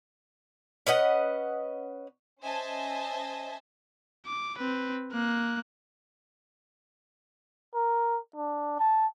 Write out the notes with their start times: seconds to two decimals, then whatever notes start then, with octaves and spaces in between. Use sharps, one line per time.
0.87 C#4 B4 D#5 F#5
2.43 C#4 C5 D#5 E5 G#5 A5
4.26 D6
4.58 C4 B4
5.12 A#3 F#6
7.75 A#4
8.36 D4
8.79 A5